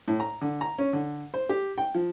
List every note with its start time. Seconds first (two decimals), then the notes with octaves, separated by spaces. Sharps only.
0.08 A2
0.20 A#5
0.41 D3
0.61 A#5
0.79 C#4
0.93 D3
1.34 C5
1.49 G4
1.78 G5
1.95 F3